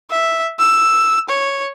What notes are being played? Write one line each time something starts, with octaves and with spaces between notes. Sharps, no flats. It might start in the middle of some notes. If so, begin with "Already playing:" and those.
E5
E6
C#5